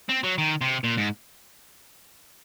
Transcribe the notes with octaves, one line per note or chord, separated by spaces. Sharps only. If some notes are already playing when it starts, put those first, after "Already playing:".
C4
F#3
D#3
C3
A#2
G#2